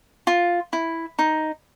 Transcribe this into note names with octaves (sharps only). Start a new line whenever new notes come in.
F4
E4
D#4